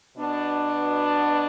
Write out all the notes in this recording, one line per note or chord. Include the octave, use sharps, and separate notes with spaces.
B2 B3 D4